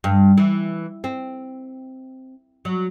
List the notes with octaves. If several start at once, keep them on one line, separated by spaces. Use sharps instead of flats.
G2
E3
C4
F#3